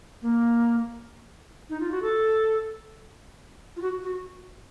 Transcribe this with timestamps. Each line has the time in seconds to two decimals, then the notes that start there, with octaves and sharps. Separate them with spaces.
0.22 A#3
1.70 D#4
1.80 F4
1.91 F#4
2.02 A4
3.77 F4
3.82 F#4
4.04 F#4